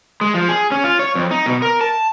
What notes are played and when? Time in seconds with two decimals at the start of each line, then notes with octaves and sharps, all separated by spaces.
0.21 G#3
0.34 F3
0.48 G#4
0.72 C#4
0.84 F4
0.99 C#5
1.15 F2
1.31 D#4
1.46 B2
1.62 A#4
1.81 A5